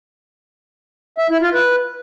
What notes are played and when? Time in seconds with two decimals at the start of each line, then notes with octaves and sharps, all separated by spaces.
1.18 E5
1.30 E4
1.42 F4
1.53 B4